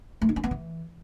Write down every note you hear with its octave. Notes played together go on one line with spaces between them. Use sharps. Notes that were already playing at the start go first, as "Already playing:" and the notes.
A3
D#4
C#4
B3
E3